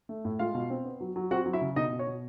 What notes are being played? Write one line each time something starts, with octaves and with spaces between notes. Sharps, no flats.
A3
A2
G#3 F4 F5
B2
C4
B3
F#3
F#3
C4 F#4 F#5
F#3
E4 E5
C#3
B2 D#4 D#5
B2
C#5
B2